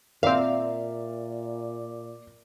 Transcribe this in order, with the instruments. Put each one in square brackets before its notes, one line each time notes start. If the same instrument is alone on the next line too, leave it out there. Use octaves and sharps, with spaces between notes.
[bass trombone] A#2 [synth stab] C4 F5 [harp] A#4 E5 [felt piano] D5